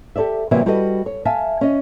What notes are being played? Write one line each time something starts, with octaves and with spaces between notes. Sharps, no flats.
G4 A4 C#5 D5 E5
C3 E3 F#3 G3 A#3 B3
G3 F#4 A4 B4 D#5
C#5
E5 F5 G#5 A5
C#4 D#5